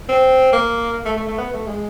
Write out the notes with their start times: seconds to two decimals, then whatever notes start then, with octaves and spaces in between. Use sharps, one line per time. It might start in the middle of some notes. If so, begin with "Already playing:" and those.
0.09 C4
0.53 A#3
1.05 A3
1.17 A3
1.28 A3
1.38 B3
1.53 A3
1.67 G#3